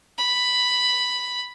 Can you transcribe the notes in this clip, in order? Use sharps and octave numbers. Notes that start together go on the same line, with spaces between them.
B5